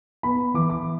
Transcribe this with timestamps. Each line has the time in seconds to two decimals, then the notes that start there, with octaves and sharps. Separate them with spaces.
0.23 B3 B5
0.54 E3 D6
0.70 D6